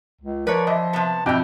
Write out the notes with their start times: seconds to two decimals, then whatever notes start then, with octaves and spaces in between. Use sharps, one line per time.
0.21 C#2
0.47 F3 A#4 B4 C#5 D5
0.67 E3 D#5 E5
0.93 C3 B3 A5
1.26 F2 B2 E3 E4 G5